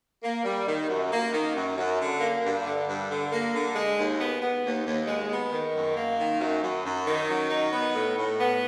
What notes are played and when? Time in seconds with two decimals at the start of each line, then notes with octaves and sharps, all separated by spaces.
0.23 A#3
0.45 G3
0.67 D#3
0.88 F#2
1.11 A#3
1.32 D#3
1.55 F#2
1.77 F#2
1.99 D3
2.20 A#3
2.43 G2
2.65 D3
2.87 G2
3.10 D3
3.31 A#3
3.54 D3
3.76 G#3
3.97 D#2
4.20 B3
4.42 B3
4.64 D#2
4.85 D#2
5.07 G#3
5.30 B3
5.52 D#3
5.73 F#2
5.96 A#3
6.18 D#3
6.40 F#2
6.62 F#2
6.84 F#2
7.06 D#3
7.28 F#3
7.50 D#4
7.72 B3
7.94 A2
8.16 A2
8.39 B3